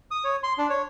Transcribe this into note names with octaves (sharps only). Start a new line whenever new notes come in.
D#6
C#5
C6
D4
C#5